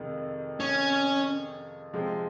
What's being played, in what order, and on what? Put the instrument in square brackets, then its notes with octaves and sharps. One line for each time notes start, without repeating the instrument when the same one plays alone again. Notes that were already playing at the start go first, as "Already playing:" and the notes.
Already playing: [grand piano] F2 C3 D#3 G#3
[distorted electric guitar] C#4
[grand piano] C3 F3 G#3 C4